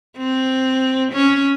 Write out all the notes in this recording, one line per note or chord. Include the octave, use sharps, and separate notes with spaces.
C4
C#4